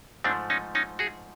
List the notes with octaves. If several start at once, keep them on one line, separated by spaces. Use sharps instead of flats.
G#2 F3 A3 C4 D4
C#4 D#4
C#4 D#4
F#4 G#4